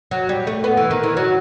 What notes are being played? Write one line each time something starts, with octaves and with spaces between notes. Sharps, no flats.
F#3
G3
A3
B3
E3
D#3
E3
F#3